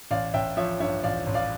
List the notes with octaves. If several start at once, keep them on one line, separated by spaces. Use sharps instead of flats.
A1 D5 F5
A1 E5 G5
F3 C#5 E5
G2 C#5 E5
A1 D5 F5
A1
D5 F5